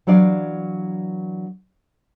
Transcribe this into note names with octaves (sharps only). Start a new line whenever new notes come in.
E3 F#3 D4 D5 F5